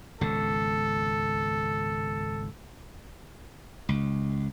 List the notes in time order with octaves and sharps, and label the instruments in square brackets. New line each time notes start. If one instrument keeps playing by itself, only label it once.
[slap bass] G#1 C#2 B2 [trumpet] A4
[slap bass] C#2